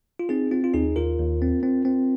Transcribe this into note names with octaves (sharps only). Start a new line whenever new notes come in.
F4
C4 D#4 G#4
C4 F4
F4
D#2 D#4 G#4
D#2 F4 A#4
D#2
C4
C4
C4